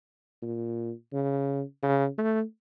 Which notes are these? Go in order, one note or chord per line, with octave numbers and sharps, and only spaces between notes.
A#2
C#3
C#3
A3